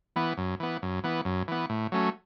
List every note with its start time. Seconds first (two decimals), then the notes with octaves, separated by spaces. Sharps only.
0.16 E3 B3
0.37 F#2
0.60 E3 B3
0.82 F#2
1.04 E3 B3
1.25 F#2
1.48 E3 B3
1.70 A2
1.92 F#3 A3 C#4